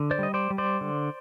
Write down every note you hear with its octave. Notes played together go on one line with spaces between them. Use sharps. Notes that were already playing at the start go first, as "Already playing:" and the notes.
Already playing: D3
C5 D5
G3 D#5
C5 D5
G3
C5 D5
D3